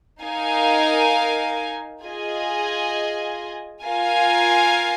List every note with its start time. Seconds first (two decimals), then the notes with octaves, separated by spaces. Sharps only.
0.22 D#4 A#4 F5 G#5
2.02 F4 G#4 D#5 G#5
3.83 F4 A#4 F5 G#5